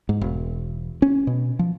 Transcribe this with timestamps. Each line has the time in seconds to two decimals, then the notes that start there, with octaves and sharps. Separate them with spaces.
0.09 G#2
0.21 E1
1.02 C#4
1.27 B2
1.59 F3